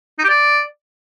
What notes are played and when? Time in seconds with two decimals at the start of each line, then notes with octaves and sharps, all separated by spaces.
0.19 D#4
0.24 G4
0.29 D5